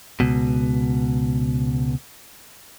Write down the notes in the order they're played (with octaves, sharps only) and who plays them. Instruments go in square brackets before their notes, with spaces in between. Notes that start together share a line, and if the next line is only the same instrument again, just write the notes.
[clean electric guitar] C#2 B2